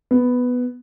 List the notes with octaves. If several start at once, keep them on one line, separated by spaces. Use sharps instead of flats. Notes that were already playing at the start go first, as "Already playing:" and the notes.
B3